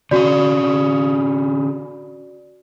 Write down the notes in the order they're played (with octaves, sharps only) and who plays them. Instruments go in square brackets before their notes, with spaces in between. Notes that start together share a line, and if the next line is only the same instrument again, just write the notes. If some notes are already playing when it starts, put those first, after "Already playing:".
[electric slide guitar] D3 C#4 F5 [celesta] F#4 D5